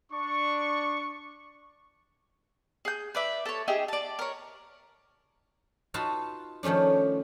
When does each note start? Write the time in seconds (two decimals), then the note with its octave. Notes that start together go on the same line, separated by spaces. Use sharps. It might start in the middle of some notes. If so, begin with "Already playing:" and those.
0.11 D4 C#6
2.85 G#4 G6
3.15 B4 D5 E5
3.46 A4 C#5
3.68 D#4 G4 G#4 E5
3.88 D5 A5
4.19 A#4 C#5
5.94 D#4 F4 F#4 B4 F5 A5
6.63 D#3 F3 A3 C#4 D4